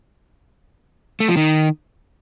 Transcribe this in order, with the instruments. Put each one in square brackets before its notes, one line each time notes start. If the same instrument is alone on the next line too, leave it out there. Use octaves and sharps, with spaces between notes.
[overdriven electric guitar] A3
F3
D#3